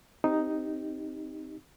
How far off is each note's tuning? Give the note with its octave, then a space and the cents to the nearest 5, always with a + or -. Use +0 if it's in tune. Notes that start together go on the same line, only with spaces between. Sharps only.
C4 +0 D#4 +0 G4 +0